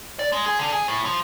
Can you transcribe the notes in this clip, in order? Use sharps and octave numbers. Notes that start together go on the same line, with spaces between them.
D5
G#3
G#4
D3
G#4
A2
F3